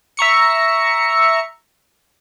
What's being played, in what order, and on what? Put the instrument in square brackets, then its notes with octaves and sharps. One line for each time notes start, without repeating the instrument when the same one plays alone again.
[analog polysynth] E5 A#5 C#6 C#7